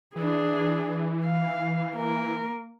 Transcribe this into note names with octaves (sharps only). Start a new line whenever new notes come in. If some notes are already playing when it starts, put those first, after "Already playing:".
E3 D4 G#4
F5
A#3 A#4